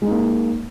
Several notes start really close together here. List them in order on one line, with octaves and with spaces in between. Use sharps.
G#3 D#4 A#3